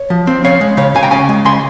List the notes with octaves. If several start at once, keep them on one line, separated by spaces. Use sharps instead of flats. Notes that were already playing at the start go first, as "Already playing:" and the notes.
Already playing: C#5
F3
C4
C#4 C#5 F5
G#3
C#3 C#5 F5
C#3 F5 G#5
G5 A#5
C#4 F5 G#5
G#3
C#3 G#5 C6